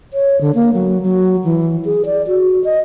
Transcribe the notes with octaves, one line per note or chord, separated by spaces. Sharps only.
C#5
D3
A#3
F#3
F#3
E3
G#4
D5
F#4
D#5